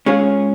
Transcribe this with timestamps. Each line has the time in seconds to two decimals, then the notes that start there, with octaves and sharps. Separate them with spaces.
0.06 G#3 C#4 F4 G#4